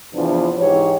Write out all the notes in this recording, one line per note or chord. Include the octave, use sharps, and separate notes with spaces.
E2 C3 E3 F3 D4 B4
G#2 E3 D#4 G4 C#5